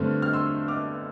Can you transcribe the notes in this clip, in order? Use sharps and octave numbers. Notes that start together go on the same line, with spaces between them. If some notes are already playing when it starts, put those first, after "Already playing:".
Already playing: G2 D3 A3 C4 F6
F6
C6 E6
D6 F6